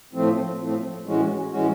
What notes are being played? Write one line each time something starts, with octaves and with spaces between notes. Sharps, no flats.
A2 F3 A3 C4
A2 F3 A3 C4
A2 E3 G#3 C#4 F#4
A2 E3 G#3 C#4 F#4